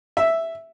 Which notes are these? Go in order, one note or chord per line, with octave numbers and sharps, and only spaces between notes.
E5